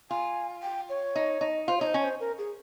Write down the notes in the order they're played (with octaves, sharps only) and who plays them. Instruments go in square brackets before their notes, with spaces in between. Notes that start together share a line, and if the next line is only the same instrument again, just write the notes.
[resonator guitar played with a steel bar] F4 [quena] G#5
[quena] G5
C#5
[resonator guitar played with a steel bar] D#4
D#4
[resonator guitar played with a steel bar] F4 [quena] C5
[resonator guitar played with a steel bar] D#4 [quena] C#5
[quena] C5
[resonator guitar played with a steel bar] C#4 [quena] C#5
[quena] C5
A#4
G#4